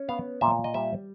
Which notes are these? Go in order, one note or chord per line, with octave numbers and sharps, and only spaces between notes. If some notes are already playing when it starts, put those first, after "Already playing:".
Already playing: C#4
B3 F5
A#2 E5
D#5
G3 E5